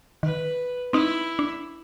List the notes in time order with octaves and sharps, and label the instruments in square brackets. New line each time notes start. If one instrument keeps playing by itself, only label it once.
[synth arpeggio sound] D#3 [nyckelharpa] B4
[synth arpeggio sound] C4 D#4 [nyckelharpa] E4
[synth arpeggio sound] D4